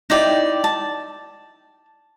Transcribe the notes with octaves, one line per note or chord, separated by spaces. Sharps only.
D#4 E4 D5 G5
A5